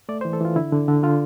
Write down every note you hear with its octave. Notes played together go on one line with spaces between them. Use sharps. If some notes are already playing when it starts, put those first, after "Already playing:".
A3 D5
C5
E3
A4
E3 F4
D3 E4
D3
D3
D3 F4